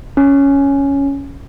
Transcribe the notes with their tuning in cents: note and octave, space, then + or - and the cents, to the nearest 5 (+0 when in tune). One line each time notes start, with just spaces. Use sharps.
C#4 +5